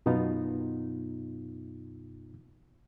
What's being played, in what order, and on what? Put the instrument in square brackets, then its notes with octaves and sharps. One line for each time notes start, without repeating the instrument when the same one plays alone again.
[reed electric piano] F#2 B2 B3 D#4 F4